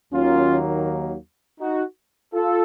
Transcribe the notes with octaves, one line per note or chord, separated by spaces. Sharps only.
D#2 D#3 F#3 A#3 C#4 F4
D#4 F#4
F4 A4